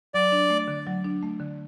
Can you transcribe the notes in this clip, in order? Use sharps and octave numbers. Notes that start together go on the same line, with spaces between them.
F#3 D5
D4
A3
D3
F#3
D4
A3
D3